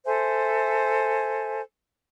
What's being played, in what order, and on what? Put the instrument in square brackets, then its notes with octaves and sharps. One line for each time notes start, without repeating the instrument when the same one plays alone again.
[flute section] A4 C5 E5 G#5